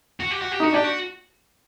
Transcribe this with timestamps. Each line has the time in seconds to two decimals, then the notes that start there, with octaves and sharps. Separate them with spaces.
0.20 F#4
0.31 G4
0.42 F#4
0.52 G4
0.60 D#4
0.63 F#4
0.73 D4 G4
0.84 F#4